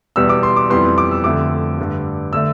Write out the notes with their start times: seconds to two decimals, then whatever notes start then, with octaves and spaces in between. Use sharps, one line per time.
0.16 E2 B2 G3 B3 E6
0.29 D6
0.43 C6
0.56 D6
0.70 F2 E3 G3 B3 C6
0.98 D6
1.11 E6
1.24 F2 D3 A3 D6
1.78 G2 D3 A3
2.33 D3 A3 E6